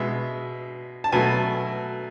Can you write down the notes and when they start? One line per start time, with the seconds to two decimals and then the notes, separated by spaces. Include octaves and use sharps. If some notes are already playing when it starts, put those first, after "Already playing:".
Already playing: B2 G#3 E5
1.04 A5
1.12 B2 F#3 A3 G#5